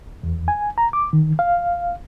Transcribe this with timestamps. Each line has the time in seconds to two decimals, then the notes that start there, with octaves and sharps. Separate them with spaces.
0.23 E2
0.48 G#5
0.78 A#5
0.93 D6
1.13 D#3
1.39 F5